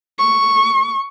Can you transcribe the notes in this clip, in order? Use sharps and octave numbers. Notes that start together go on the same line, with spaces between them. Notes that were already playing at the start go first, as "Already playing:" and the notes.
C#6